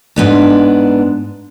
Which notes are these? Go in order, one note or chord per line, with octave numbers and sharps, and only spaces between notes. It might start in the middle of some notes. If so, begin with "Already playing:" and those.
G#2 B3 D4